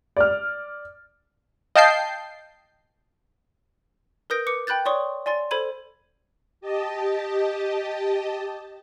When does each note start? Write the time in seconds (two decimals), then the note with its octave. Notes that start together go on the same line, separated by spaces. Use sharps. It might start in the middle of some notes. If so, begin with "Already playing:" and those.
0.17 D5 F6
1.75 D#5 F5 G5 A5 G6 C7
4.30 A#4 B4 D#6 G6 A#6 D7
4.47 B4 D6 C#7
4.67 G5 B5 F#6 G6 A6
4.85 C#5 D5 C6 C#6 D#6
5.26 D5 G#5 C6 A6
5.51 A4 C5 B5 G#6 D#7
6.61 G4 D#5 A5